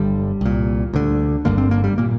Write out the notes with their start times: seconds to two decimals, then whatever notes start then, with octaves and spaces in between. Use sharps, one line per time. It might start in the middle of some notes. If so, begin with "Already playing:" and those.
Already playing: G1 G2 D3 G3
0.41 C2 A#2
0.94 D2 D3
1.45 G1 G2 D3 A#3
1.58 C4
1.71 A#3
1.84 G3
1.98 A#2 A#3